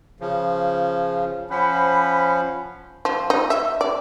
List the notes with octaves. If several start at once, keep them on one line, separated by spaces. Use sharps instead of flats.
C#3 F3
F3 C#4 C5 F#5 B5
F3
D#4
E5
D5